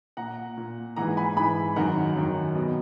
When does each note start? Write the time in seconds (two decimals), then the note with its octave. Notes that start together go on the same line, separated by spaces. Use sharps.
0.17 A#2 F#5 A#5
0.57 A#2
0.96 G#2 E3 F#5 A#5
1.17 G#5 B5
1.37 G#2 E3 G#5 B5
1.76 F#2 D#3 F#5 A#5
2.16 F#2 D#3
2.55 B2